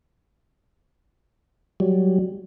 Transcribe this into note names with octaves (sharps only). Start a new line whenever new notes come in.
F#3 G3